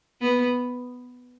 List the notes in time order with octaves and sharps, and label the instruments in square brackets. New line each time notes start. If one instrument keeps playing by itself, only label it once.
[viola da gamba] B3